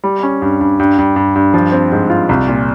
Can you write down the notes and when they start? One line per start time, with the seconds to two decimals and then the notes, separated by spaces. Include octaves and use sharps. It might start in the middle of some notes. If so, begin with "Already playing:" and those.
0.04 G3
0.23 C#4
0.42 G2
0.61 G2
0.79 G2
0.98 G2
1.16 G2
1.35 G2
1.54 F3
1.72 C4
1.92 G#2
2.10 F4
2.29 C2
2.48 A#2